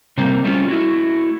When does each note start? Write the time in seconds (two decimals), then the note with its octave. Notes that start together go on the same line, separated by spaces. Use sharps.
0.18 C3 G3 A3 A#3 C4
0.44 G3 A3 C4 C#4 F4
0.68 A3 E4 F#4